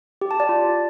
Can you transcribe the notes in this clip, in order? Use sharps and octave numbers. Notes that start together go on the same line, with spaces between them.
G4
A5
D5
F4